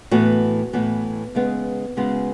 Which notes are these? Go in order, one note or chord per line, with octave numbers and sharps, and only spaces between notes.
A2 E3 B3 F#4
A2 E3 B3
C#3 G#3 B3
C#3 G#3 B3 F#4